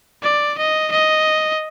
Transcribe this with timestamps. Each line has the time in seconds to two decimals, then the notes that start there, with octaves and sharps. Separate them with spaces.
0.23 D5
0.58 D#5
0.92 D#5